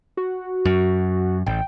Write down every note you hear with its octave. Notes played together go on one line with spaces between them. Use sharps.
F#4
F#2
A1 G5